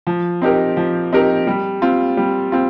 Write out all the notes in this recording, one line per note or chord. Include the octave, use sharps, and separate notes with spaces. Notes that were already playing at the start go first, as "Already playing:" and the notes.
F3
C4 D#4 G4 A#4
F3
C4 D#4 G4 A#4
G3
C4 F4
G3
C4 F4